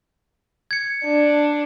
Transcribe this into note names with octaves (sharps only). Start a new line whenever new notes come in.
G#6 C#7
D4